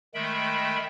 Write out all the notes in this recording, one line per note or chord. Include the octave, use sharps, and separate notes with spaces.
D#3 G#3 A3 E5 G5 B5